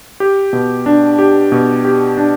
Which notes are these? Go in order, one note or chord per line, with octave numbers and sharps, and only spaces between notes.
G4
B2
D4
G4
B2
G4
D4